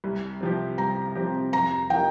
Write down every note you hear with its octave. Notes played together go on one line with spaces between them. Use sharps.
C2
C3 F3 C4 G4
C2 A#5
C3 F3 C4 G4
F2 A#5
F3 D#4 G4 A#4 G5